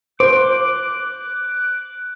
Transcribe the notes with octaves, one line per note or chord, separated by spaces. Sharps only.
C5 D6 F#6